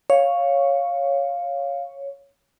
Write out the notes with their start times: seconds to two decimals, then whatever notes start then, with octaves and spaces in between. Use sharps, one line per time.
0.10 C#5 F5